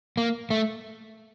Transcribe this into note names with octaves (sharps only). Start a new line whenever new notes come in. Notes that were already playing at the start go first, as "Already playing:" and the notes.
A#3
A3